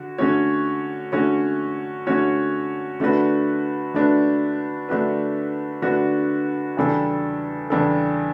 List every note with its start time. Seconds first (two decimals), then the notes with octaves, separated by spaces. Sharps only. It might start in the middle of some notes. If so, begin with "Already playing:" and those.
Already playing: D3 F#4
0.18 D3 A3 C#4 F#4 C#5
1.12 D3 A3 C#4 F#4 C#5
2.07 D3 A3 C#4 F#4 C#5
3.00 D3 A3 D4 F#4 B4
3.94 D3 A3 D4 F#4 B4
4.89 D3 A3 D4 F#4 B4
5.82 D3 A3 D4 F#4 B4
6.77 E2 C#3 G3 D4 A4
7.70 E2 C#3 G3 D4 A4